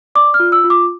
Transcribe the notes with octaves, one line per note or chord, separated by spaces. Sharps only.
D5 D6
F6
F4
E6
F4
D6